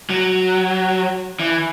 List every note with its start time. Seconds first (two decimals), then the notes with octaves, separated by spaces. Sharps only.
0.10 F#3
1.40 E3